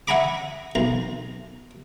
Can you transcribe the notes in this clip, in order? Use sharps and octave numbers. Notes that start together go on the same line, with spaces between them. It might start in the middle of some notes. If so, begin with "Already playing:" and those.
E5 F#5 G#5 A#5 B5 D6
B1 A#5